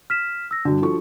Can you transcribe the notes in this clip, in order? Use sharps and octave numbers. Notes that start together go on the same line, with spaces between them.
F6 B6 E7
E6 A#6
G2 D3 D4 F#4
F3 A4 C#6